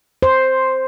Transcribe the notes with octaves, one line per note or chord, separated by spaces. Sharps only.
C5